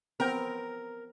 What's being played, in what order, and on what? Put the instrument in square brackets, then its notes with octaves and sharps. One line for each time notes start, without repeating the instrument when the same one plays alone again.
[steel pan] B3 C4 G5 [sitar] A#4